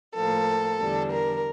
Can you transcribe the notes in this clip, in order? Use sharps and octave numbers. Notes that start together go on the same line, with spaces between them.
A2 F3 A#3 A4
E2 D3 G3 D4
A#4